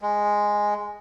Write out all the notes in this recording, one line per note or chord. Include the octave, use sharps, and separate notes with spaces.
G#3